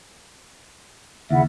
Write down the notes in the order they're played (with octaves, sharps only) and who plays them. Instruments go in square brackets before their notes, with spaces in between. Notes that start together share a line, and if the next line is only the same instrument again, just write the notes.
[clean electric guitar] D#2 [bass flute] C#3 [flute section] E4 E5 F#5